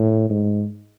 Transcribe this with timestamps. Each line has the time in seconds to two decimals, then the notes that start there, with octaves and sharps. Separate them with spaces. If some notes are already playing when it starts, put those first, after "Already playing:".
Already playing: A2
0.30 G#2